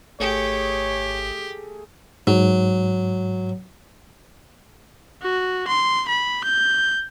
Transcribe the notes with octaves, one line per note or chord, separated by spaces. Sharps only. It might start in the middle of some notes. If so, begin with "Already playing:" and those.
G#1 A3 G4 G#4 C#5 C#7
G#2 F#3
F#4
C6
B5
G6